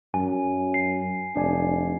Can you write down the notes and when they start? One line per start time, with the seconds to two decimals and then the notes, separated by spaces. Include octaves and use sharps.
0.14 F#2 G#5
0.74 C7
1.36 F1 D4 D5 G#5